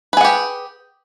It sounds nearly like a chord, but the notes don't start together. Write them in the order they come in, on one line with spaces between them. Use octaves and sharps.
B4 G#4 F#5 G4